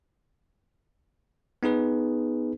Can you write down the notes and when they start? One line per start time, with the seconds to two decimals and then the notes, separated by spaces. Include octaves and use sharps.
1.63 B3 D#4 G#4 B4